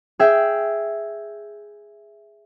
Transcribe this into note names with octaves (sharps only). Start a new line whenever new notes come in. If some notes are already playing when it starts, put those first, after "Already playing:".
G#4 E5 G5